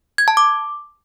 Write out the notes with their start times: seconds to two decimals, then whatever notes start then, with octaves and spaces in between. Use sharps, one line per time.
0.18 G#6
0.28 A5
0.37 D6